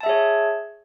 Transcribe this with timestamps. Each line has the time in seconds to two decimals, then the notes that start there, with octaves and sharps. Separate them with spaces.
0.01 A5
0.03 E5
0.06 G#4
0.09 C#5